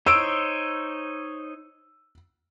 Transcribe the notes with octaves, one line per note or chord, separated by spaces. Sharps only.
D#4 C5 C#5 E6 D7